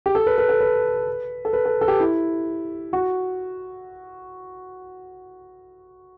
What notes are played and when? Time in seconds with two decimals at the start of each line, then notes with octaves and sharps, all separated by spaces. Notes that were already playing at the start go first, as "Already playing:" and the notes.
0.06 G4
0.15 A4
0.27 B4
0.38 B4
0.49 A4
0.61 B4
1.45 A4
1.53 B4
1.65 A4
1.81 A4
1.88 G4
2.00 E4
2.93 F#4